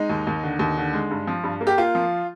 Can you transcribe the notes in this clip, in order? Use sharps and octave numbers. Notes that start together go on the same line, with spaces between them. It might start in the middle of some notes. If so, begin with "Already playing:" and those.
Already playing: G#3 D#4
D#2
D#2
D3
D#2
D3
G#3
G2
F3
G2
A#3
G4
A#3 F4
F3